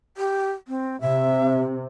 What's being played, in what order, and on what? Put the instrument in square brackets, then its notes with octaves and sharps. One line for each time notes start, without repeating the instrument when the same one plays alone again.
[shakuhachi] G4
C4
[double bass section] C3 [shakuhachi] E5